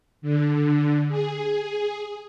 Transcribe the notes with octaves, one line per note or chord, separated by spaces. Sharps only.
D3
G#4